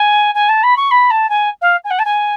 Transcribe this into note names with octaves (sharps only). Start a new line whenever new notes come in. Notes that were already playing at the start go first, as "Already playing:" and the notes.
Already playing: G#5
G#5
A5
B5
C#6
B5
A5
G#5
F5
G#5
F#5
A5
G#5